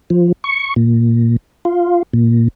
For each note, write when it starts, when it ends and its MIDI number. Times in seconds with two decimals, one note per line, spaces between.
0.10 0.32 53
0.44 0.74 85
0.76 1.37 46
1.65 2.03 65
2.13 2.48 46